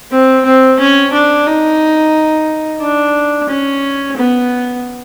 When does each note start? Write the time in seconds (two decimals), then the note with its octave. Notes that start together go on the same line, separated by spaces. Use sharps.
0.11 C4
0.45 C4
0.80 C#4
1.13 D4
1.46 D#4
2.81 D4
3.49 C#4
4.17 B3